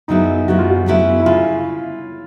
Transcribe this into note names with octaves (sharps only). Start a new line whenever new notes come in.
F#2 C#3 F#3 B3 D#4 E4
F#2 C#3 F#3 B3 E4 F#4
F4
F#4
F#2 C#3 F#3 B3 E4
E4
C#3 F4